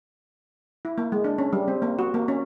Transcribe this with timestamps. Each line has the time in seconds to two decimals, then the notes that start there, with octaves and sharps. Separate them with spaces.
0.85 E4
0.98 A#3
1.12 G#3
1.24 D4
1.38 C#4
1.53 G3
1.68 C4
1.82 A#3
1.99 F#4
2.14 A#3
2.28 C#4